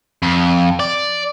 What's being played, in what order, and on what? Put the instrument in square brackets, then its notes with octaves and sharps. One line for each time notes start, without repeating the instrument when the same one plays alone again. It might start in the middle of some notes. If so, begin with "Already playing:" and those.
[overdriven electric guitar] F2
D5